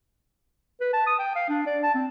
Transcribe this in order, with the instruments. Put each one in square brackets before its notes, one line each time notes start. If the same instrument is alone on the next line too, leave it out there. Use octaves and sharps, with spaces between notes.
[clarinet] B4
A5
D#6
G5
F5
D4
D5
A5
C4